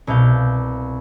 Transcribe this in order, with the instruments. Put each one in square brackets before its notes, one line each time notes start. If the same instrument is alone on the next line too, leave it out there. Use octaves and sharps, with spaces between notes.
[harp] C2 B2 F5 G6